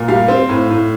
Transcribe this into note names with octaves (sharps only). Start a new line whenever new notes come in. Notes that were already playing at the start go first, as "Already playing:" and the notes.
Already playing: A#2
G3 F5
C4
A2
A2